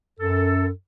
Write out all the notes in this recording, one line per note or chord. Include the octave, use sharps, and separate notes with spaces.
F#2 A4